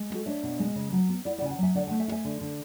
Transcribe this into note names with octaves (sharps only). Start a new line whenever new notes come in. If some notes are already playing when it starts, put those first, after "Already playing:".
Already playing: G#3
B3
F#4 A4
D4 C#5 E5
B2
G#3
C#3
F#3
B3
E4 D5 F#5
D5 F#5
C#3 G#5
F#5 A5
F#3 E5 G#5
D3 D5 F#5
F#5 A5
A3
E5 G#5
E4
E5 G#5
D3
D3